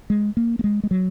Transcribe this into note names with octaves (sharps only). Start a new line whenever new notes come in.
G#3
A#3
A#3
G#3
G#3
F#3